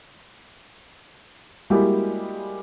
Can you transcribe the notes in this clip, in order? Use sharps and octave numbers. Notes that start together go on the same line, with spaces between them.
G3 G#3 A#3 E4 F#4 G4